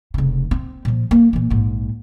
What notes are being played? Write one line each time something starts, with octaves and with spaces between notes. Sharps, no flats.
F1 C#3
C4
A#2 F3
A#3
A#2 E3
A#1 G#2